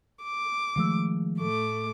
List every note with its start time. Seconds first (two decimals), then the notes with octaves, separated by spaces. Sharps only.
0.23 D6
0.76 D#3 F3 G#3 A3 E6
1.39 A2 A3 D6